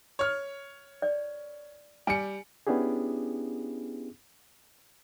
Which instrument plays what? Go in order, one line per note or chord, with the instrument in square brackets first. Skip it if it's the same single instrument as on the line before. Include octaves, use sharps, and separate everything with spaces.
[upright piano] C#5 F6
[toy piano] D5
[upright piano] G3 C#7 [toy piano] G#5
[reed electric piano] B3 C#4 D4 E4 G4 G#4